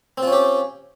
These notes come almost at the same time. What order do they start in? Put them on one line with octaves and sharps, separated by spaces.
C4 F4 C#4 G4